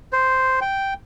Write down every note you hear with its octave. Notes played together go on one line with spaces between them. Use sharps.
C5
G5